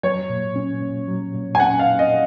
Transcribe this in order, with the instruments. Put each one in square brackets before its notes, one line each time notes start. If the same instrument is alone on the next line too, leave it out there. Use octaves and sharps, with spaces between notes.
[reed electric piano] F#3 [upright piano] C#5
[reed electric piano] A#2
C#4
A#2
F#3
A#2
[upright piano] G#5
[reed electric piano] C#4 [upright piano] F#5
[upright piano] F5
[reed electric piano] A#2
[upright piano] D#5